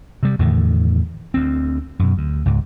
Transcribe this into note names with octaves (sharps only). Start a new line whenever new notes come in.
C3 G3
E2 A2 D3 D#3
D2 C4
F#2 B2
D2
C#2 G#2